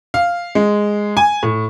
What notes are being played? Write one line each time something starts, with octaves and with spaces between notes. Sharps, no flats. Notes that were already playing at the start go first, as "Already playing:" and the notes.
F5
G#3
G#5
A2